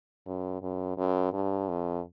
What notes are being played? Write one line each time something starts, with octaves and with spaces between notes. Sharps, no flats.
F#2
F#2
F#2
G2
F2